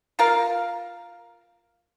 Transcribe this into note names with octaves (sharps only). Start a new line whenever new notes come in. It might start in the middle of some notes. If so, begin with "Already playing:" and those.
F4 A#4 F5